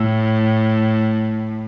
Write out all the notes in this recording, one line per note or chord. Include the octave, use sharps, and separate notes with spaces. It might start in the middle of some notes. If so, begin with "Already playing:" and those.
Already playing: A2